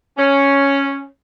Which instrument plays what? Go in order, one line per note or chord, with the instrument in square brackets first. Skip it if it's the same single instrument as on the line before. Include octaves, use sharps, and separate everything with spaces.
[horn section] C#4